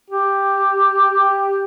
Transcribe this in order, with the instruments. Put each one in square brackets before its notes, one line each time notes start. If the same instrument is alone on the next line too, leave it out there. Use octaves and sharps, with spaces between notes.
[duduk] G4